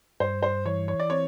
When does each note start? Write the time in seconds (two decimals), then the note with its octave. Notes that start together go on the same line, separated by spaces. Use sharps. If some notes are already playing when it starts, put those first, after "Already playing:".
0.20 G2 C5
0.43 C5
0.66 E3 C#5
0.88 C#5
0.99 D5
1.10 C4 C#5